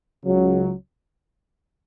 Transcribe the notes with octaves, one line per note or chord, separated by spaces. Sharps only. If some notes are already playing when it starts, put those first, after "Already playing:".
C#2 C#3 F#3